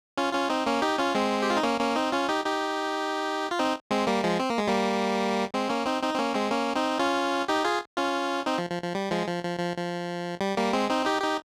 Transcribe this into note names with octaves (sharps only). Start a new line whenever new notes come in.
C#4 F4
C#4 F4
C4 D#4
A#3 C#4
D#4 G4
C#4 F4
G#3 C4
G4
F4
D#4
A#3 C#4
A#3 C#4
C4 D#4
C#4 F4
D#4 G4
D#4 G4
F4
C4 D#4
G#3 C4
G3 A#3
F3 G#3
C4
A#3
G#3
G3 A#3
G#3 C4
A#3 C#4
C4 D#4
C4 D#4
C4
A#3 C#4
G#3 C4
A#3 C#4
C4 D#4
C#4 F4
D#4 G4
F4 G#4
C#4 F4
C4 D#4
F3
F3
F3
G3
F3 G#3
F3
F3
F3
F3
G3
G3 A#3
G#3 C4
C4 D#4
D#4 G4
D#4 G4